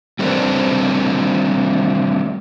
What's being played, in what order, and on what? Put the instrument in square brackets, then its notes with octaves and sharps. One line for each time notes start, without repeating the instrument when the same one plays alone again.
[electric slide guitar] G3 A3 C4 D4 A#4 B4